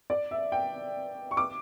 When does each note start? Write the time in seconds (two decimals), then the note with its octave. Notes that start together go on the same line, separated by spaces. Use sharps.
0.10 D5
0.31 E5
0.52 G5
1.31 C#6
1.37 D6